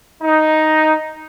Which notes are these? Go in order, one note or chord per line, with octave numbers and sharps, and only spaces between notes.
D#4